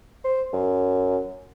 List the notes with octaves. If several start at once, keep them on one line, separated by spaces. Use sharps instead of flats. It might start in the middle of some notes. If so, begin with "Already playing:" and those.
C5
F#2